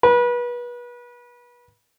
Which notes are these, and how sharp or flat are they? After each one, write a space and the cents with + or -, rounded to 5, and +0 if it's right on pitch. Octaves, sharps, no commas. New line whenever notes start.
B4 -30